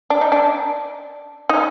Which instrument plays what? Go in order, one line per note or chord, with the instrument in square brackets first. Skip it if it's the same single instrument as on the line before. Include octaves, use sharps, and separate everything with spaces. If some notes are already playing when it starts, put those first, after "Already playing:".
[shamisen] D4
D#4
D4
D#4